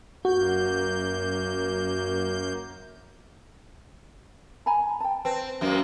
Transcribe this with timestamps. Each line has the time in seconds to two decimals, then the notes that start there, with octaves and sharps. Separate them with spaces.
0.25 F#2 A#3 F#4 G6
4.66 G#5 A#5 B5
5.00 G5 A5
5.25 C4 B4
5.61 F#2 A#3